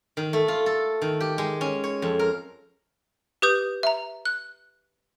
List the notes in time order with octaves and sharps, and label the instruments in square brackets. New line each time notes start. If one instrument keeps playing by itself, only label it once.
[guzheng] D#3
A3
F4
A4
D#3
G4
G#3
C#4
C#5
F2
A#4
[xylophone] G4 B4 D#6 G6
E5 A#5
F#6